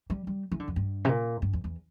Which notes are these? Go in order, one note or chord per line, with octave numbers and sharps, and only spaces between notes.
G3
G3
E3
D3
F2
G2
C3
A#2
G2
E2
E2